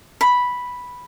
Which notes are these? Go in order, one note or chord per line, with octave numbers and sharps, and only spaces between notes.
B5